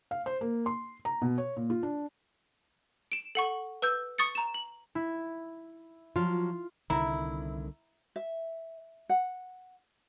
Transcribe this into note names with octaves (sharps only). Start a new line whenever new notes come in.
F5
C5
A#3
C6
A#5
B2
C#5
A#2
F4
D4
D7 E7
A4 F#5 C#6
B4 E6 G6
C#6 D#6 A6 C#7
A#5 E7
F#7
E4
F3 F#3 F4
C2 D3 D#3 E4 E5 A#5
E5
F#5